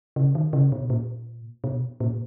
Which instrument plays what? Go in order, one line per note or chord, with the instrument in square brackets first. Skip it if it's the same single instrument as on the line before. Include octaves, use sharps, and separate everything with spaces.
[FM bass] C#3
D#3
C#3
B2
A#2
B2
A#2